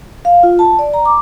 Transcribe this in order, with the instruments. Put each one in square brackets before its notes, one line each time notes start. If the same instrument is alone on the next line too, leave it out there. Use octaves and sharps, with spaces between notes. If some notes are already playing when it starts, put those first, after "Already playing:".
[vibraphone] F5
F4
A5
D5
A#5
D6